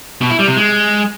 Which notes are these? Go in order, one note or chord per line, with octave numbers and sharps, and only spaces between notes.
B2
E4
G3
C3
G#3